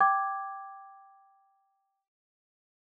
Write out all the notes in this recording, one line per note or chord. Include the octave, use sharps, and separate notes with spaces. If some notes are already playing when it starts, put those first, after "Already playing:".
G5 D6 G#6